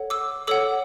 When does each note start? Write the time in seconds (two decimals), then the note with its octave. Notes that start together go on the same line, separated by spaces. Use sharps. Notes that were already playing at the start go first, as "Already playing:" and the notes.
Already playing: A4 C#5 F#5
0.10 D6 E6
0.47 A4 C#5 F#5 D6 E6